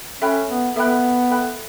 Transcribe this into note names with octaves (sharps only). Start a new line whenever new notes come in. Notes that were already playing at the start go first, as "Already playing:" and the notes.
C#4 A4 E5 G5 B5 F#6
B3
B3 A4 E5 G5 B5 F#6
A4 E5 G5 B5 F#6